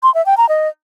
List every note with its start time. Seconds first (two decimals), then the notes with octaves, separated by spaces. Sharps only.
0.03 C6
0.14 E5
0.26 G5
0.37 A#5
0.49 D#5